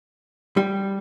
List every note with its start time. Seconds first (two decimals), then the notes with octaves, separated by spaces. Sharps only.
0.57 G3